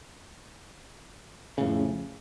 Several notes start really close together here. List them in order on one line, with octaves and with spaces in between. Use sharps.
C#3 A2 F2